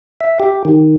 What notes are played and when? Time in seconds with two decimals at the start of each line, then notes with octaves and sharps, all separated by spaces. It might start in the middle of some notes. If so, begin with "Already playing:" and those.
0.21 E5
0.40 G4
0.65 D#3